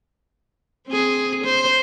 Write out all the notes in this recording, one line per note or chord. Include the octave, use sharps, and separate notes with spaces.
C4 G#4
C5